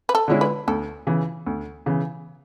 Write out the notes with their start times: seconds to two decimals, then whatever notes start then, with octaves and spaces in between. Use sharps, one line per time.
0.09 B4
0.15 A4
0.28 D3 G#3 C#4 E4
0.41 B4
0.67 D2 A4
1.07 C#3 E3
1.46 D2
1.86 C#3 E3